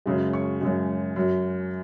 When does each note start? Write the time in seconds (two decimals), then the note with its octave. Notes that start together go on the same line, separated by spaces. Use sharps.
0.06 F#2 C#3 G#3
0.33 C#6
0.61 F#2 C#3 G#3
1.16 F#2 F#3